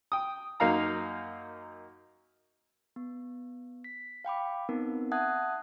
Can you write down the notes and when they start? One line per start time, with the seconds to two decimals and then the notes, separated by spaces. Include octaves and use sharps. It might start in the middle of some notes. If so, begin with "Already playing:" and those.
0.12 G5 D#6
0.60 F#2 A#3 D#4 F5 A#5
2.96 B3
3.84 B6
4.25 F5 G5 B5 D6
4.69 B3 C4 D#4 A#4
5.12 E5 F#5 A5 D#6 F#6 G#6